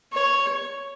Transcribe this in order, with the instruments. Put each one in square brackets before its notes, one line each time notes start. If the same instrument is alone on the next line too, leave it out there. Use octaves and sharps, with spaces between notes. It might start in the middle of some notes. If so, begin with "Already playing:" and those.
[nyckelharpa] C#5